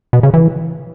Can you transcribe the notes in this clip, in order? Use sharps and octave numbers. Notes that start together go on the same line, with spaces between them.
B2
C#3
E3